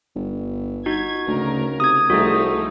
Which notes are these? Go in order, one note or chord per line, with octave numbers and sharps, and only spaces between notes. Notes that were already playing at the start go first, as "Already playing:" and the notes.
G1
D#4 F#4 G#6
D2 C#3 A#4
C3 D#6 G#6
C2 F3 A3 D#4 F#4 G#4